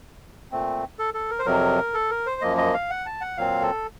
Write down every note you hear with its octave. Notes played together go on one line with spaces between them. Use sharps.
A#2 A3 C4
A4
A4
A#4
C5
F2 C3 F#3 A#4
A4
A#4
C5
F#2 F3 A#3 D#5
D#5
F5
F#5
A5
F#5
A#2 F#3 C4 F5
A4